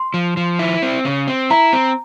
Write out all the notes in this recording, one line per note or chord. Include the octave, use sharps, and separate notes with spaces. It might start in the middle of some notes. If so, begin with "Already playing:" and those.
Already playing: C6
F3
F3
E4
C4
C#3
C4
E4 A#5
C4